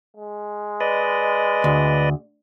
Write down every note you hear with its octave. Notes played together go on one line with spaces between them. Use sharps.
G#3
B4 D5 D#5
D2